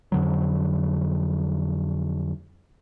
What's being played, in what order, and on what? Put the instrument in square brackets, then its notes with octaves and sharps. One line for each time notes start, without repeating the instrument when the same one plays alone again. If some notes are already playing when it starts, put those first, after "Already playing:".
[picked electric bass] F2 D3 F#3